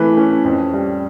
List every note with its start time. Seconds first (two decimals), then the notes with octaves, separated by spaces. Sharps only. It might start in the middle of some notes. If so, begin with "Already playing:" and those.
Already playing: E3 A3 B4
0.17 C#4
0.45 F2
0.74 G3